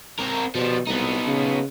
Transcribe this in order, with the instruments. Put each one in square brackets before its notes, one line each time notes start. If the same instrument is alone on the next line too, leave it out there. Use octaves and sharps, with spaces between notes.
[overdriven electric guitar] C4 A#4
[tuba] B2 [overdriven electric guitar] F3 G3
[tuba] C2 [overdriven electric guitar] B3 D#4
[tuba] C#3